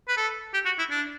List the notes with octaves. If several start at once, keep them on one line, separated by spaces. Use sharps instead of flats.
B4
A4
G4
F#4
E4
D4